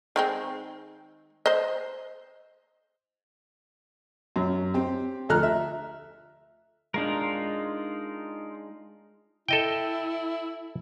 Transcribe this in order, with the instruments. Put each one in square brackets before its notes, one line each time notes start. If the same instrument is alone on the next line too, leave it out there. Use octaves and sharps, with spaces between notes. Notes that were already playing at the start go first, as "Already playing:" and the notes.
[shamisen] D#3 G#3 C4
C5 D#5
[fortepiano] F#2
C4 G4
D2 F3 A4 A#5 F6 F#6
E5
[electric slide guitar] G#3 D4 [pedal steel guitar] D#4 F4 A#4
[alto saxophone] E4 [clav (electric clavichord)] A4 D#5 G5